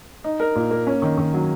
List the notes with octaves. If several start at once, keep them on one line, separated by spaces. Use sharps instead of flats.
D#4
A#4
A#2
A#3
C#4
D#3
D#3
F#3